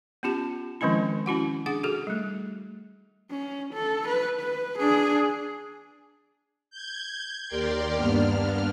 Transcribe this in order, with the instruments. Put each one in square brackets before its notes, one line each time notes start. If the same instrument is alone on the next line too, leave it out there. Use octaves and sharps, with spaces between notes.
[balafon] B3 C#4 F4 G4 A5
D#3 F3 G#3 C4 C#4 E4
C#4 E4 F#4 F#5
D4 G#4 F#5 D6
F#4 G#4 A4
G3 A3
[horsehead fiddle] C#4
A4
B4
B4
D4 G#4
[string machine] G6 G#6
D#2 G4 A#4 D5 G5 C6
G2 A#3 B3 D4 F6